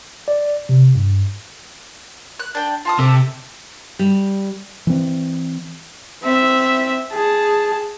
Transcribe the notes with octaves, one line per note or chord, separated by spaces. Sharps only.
D5
C3
G2
F#6
D4 G5
F4 A5 D#6
C3 G4 A4
G3
E3 C4
C4 E5
G#4 A5